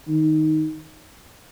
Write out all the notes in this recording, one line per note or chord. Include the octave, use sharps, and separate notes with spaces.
D#3